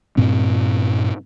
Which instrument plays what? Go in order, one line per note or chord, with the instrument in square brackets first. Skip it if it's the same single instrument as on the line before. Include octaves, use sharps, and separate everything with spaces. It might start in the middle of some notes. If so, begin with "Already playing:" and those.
[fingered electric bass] G2 A#2 C4